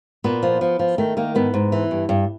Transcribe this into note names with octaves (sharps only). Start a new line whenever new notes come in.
A#2 B3
F3
F3
F3
D#3 A3
D#3 A#3
G#2 B3
G#2
E3
G2
G2